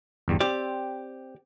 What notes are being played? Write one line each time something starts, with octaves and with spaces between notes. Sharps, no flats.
G1 E2 G3
C4 G4 D5